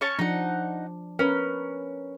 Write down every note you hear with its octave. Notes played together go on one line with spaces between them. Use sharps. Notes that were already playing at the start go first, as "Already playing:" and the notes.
C#4 C#5 A5
F3 D4 D#4 F#5
C#4 A#4 B4